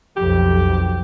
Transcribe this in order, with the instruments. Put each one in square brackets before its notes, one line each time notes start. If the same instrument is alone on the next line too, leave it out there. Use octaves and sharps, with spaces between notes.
[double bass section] B1 F2 [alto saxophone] G4